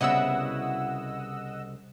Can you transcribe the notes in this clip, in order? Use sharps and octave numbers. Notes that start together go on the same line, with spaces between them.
C2 C#3 B3 E4 F#4 D#5 F#5 E6